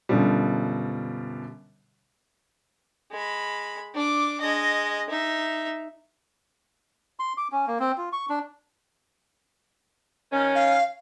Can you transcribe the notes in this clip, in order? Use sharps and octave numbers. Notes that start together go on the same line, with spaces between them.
F#2 B2 D3 F3 G3
G#3 B5
D4 D6
G#3 D#5
D#4 E5
C6
D6
C#4
A#3
C4
F4
C#6
D4
D#3 C#4
F5